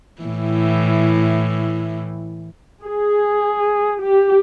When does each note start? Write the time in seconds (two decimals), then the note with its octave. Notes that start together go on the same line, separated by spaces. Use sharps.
0.22 A2 E3
2.84 G#4
4.00 G4